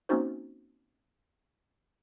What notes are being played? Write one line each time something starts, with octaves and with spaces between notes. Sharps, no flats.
A#3 C4 C#4 D#4 F#4 C5